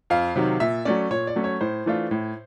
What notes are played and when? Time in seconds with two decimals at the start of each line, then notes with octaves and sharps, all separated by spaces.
0.10 F2 F5
0.36 C3 D#3 F#3
0.60 A#2 E5
0.85 F#3 A3 C#4 D5
1.11 A#2 C#5
1.27 D5
1.36 F#3 A3 C#4
1.44 C#5
1.61 A2 C5
1.86 E3 A3 D4 F4
2.11 A2